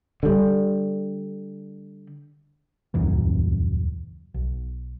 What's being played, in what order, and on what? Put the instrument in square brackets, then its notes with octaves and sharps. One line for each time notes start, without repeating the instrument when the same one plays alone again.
[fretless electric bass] D3 G3
[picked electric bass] D#1 C#2 F#2 E3
B1